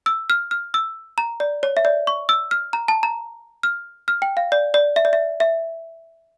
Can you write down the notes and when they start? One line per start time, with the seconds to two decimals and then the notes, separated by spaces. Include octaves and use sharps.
0.06 E6
0.30 F6
0.51 F6
0.74 E6
1.18 A#5
1.40 D5
1.63 C#5
1.77 E5
1.85 D5
2.07 C#6
2.29 E6
2.51 F6
2.73 A#5
2.88 A5
3.03 A#5
3.63 F6
4.08 F6
4.22 G5
4.37 F5
4.52 D5
4.74 D5
4.96 E5
5.05 D5
5.13 E5
5.40 E5